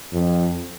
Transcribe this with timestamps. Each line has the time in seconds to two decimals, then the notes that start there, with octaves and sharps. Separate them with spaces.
0.13 F2